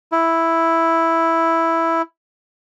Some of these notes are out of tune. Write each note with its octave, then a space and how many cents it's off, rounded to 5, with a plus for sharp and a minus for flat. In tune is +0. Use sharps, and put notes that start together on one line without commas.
E4 +0